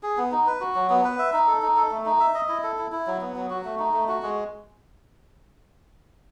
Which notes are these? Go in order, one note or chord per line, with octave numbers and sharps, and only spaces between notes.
G#4
B3
D#4
B4
F#4
F#3
B3
B4
E5
D#4
A4
D#4
A4
A3
D#4
E5
D#5
E4
A4
E4
E4
F#3
B3
F#3
F#4
A3
D#4
A3
F#4
G#3